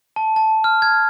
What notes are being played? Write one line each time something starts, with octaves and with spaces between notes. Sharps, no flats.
A5
A5
F6
G#6